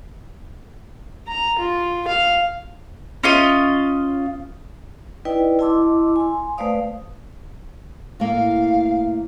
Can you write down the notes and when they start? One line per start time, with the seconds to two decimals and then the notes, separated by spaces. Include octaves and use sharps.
1.27 A#5
1.59 F4
2.08 F5
3.24 C#4 F4 D#5
5.25 D#4 E4 B4 D5 D#5 G5
5.59 E4 D#5 A5 C6 D6 E6
6.16 G#5 C6
6.58 A3 B4 C5 D5 F5 D#6
8.20 A2 A#3 F5